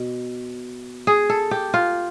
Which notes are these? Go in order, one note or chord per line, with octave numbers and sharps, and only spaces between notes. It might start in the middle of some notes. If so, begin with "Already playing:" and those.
Already playing: B2
G#4
A4
G4
F4